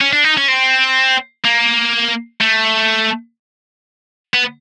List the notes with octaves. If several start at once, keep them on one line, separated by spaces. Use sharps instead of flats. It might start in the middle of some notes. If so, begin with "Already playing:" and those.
C#4
D4
D#4
C#4
C4
A#3
A3
B3